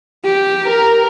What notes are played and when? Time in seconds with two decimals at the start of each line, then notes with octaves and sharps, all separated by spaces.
0.25 G4
0.66 A#4